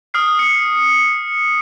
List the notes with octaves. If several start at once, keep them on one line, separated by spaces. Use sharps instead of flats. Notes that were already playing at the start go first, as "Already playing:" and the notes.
D#6 F6 C7
C#7